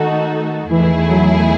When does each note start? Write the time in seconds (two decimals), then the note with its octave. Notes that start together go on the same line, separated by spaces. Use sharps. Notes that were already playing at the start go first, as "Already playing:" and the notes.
Already playing: D#3 A3 D#4 F#4 A4
0.69 E2 D#3 E3 A3 E4 G#4
1.09 F#3